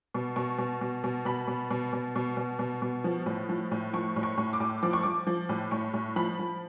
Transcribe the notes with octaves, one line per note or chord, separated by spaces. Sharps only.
B2
B2 C#6
B2
B2
B2
B2 B5
B2
B2
B2
B2
B2
B2
B2
F3
A2
F3
A2
F3 C#6
A2
C#6
A2
D6
A2
F3 D6
C#6
F3 D6
F3
A2
A2 C#6
A2
F3 B5
F3